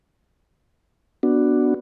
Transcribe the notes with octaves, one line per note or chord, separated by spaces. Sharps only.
B3 D4 F#4